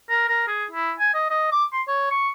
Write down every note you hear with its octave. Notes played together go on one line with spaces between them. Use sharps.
A#4
A#4
G#4
E4
G#5
D#5
D#5
D6
C6
C#5
C#6